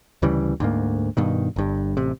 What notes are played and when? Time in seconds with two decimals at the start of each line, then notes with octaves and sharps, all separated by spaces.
0.22 D2 C#3 E3 G3
0.60 D2 G#2 A#3
1.17 G2 B2 D#3
1.56 G1 G2
1.97 A1 C3